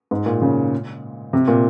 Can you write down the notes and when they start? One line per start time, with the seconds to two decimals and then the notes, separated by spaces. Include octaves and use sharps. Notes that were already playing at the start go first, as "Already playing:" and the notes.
0.11 G#2
0.26 A#2
0.42 C#3
1.33 C3
1.48 A#2